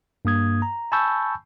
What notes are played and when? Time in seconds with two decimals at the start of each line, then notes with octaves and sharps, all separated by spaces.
0.25 G2 A#3 D#6 G#6
0.62 A#5
0.92 G#5 A5 B5 C#6 E6 G6